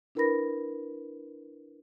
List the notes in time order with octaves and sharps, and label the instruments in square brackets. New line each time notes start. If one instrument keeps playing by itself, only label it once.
[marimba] D4 E4 A#4 B4 B5 A#6